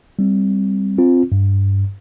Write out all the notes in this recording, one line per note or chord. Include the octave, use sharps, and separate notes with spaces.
G3 C4
C4 F4
G2